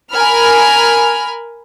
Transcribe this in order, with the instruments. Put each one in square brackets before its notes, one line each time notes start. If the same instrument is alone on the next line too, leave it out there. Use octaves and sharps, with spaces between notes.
[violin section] A#4 G#5 B5 F6